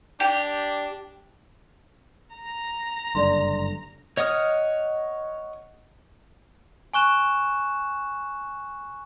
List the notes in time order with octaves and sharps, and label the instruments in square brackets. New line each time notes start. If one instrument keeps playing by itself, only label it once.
[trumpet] D4 [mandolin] G4
[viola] A#5
[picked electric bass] F#1 G2 D3 [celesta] D5 C6
[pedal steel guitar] C#5 D#5 F#5 D#6 F6
[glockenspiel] G#5 C#6 F#6 E7